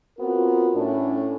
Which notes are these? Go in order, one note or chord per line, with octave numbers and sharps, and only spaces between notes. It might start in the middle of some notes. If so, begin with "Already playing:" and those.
B3 C4 F4 F#4 A#4
A2 A3 C#4 D4